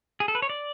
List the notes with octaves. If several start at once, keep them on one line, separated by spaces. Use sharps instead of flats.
G#4
A4
B4
C#5
D5